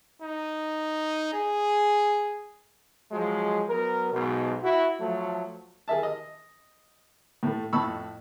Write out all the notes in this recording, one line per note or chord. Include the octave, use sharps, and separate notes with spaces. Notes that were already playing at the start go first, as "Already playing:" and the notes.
D#4
G#4
F3 F#3 G#3
F#3 B3 A#4
B1 G#2 B2
E4 F#4
F3 F#3 A3
G#4 A#4 E5 A5
D#5
A2 A3
F2 A2 A5 B5 C#6 E6